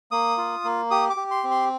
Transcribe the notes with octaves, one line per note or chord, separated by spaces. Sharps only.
A#3 D#6
F4
A#3
G4 D#6
D6
G4
C6
C4
C6